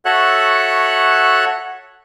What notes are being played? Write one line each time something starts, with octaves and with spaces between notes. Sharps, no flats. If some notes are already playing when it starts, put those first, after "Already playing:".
F#4 A4 C#5 E5 F#5 F#6